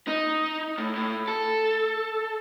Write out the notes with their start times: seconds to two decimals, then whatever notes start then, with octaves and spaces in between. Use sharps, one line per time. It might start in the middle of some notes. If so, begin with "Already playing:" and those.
0.08 D#4
0.78 A2
0.96 A2
1.28 A4